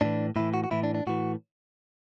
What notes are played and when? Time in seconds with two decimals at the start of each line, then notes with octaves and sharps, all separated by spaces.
0.01 A2 E3 D4
0.36 A2 E3 E4
0.54 F#4
0.64 F#4
0.71 A2 E3 E4
0.84 D4
0.95 D4
1.07 A2 E3 F#4